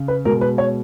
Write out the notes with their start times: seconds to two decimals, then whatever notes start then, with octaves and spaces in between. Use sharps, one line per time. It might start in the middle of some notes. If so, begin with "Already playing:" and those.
Already playing: C#3
0.08 B4
0.25 B2 G#3 A#4
0.41 B4
0.58 C#5